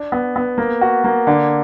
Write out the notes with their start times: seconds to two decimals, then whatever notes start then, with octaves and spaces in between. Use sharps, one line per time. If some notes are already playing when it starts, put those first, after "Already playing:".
Already playing: D4
0.12 B3
0.36 B3
0.58 A#3
0.81 F#4
1.04 A#3
1.27 D3